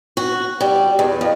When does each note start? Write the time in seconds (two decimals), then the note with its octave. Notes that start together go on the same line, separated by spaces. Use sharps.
0.17 F#4
0.61 G3
0.99 E2
1.21 F2